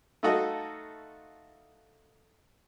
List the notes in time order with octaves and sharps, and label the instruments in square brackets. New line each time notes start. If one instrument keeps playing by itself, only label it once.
[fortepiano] A3 D#4 F4 F#4 A4 D#5